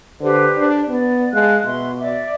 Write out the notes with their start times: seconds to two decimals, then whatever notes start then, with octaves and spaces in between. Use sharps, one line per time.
0.20 D3 G4 B4 C5
0.57 D4
0.89 B3 D5
1.33 G#3 F5 A5 F#6
1.64 B2 F#4 E5 C6
1.99 D5 E5 D6